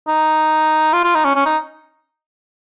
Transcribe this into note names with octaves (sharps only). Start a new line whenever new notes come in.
D#4
F4
F4
D#4
C#4
C#4
D#4